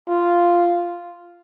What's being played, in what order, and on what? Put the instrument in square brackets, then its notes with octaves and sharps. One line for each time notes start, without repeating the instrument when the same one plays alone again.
[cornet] F4